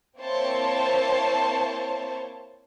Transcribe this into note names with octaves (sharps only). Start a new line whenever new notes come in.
A#3 C4 E4 C5 C#5 A5